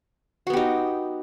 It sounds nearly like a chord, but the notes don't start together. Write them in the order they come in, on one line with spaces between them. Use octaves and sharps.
F#4 B3 G4 D#4